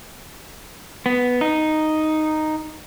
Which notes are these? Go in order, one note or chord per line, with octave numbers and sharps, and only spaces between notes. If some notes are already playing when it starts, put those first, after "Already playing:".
B3
D#4